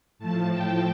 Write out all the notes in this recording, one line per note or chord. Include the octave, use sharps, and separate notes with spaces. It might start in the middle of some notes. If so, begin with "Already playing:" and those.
A2 F3 A5
G5